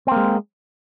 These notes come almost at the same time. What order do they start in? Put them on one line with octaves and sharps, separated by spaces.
C4 A#3 G#3